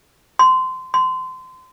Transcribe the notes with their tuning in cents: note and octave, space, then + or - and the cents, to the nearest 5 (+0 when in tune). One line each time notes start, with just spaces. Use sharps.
C6 -20
C6 -25